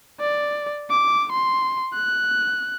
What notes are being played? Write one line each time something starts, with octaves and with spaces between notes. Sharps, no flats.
D5
D6
C6
F#6